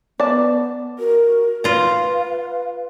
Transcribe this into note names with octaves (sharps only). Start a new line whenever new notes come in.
B3 D5 A5
F#4 A#4
F4 B4 F5 A#5